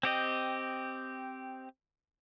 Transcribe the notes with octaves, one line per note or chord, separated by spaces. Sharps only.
C4 G4 D#5